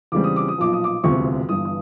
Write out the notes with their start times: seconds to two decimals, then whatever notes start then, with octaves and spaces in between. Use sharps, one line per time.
0.12 E2 C#3 E3 G3 C4 D6
0.24 D#6
0.36 D6
0.48 D#6
0.58 B1 A#2 F3 D6
0.73 D#6
0.84 D6
1.03 E1 D2 C3 F3 C#6
1.49 G1 G2 E3 D#6
1.65 D#6